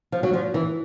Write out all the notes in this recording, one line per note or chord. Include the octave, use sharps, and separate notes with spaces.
F3
F#3
F3
E3